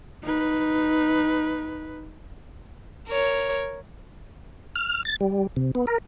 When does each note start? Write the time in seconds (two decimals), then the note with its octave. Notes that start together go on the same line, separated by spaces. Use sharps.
0.22 D#4 B4
3.08 A#4 C#5
4.76 F6
5.05 A6
5.21 G3
5.56 C3
5.75 B3
5.87 A#4